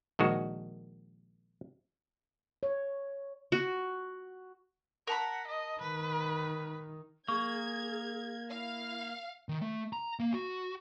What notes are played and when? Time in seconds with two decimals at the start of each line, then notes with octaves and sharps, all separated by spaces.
0.19 A#1 D#3 G#3 F#4
2.63 C#5
3.52 F#4
5.07 A#4 F#5 A5 B5
5.48 D#5
5.81 D#3 B4
7.28 A#3 G#4 C#6 G#6
8.51 E4 F5
9.49 D#3
9.62 A3
9.93 A#5
10.19 A#3
10.33 F#4